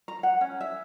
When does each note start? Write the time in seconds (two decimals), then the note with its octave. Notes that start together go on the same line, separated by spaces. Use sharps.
0.08 A#5
0.23 F#5
0.41 C#4
0.61 E5